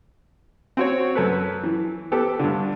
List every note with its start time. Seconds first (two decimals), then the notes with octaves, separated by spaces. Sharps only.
0.77 C4 F#4 C#5
1.15 F#2 A4 B4
1.63 E3
2.12 B3 G4 A4
2.39 G2 D3